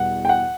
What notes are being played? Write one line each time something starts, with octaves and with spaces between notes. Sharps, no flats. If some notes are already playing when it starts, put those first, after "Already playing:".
Already playing: E2 B2 G3 B3 F#5
G5
F#5